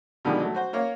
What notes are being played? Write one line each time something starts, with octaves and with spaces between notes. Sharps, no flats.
B2 D3 D#3 F3 G3 G#3
F#3 A3
F#4 C5
A#3 C#5 F5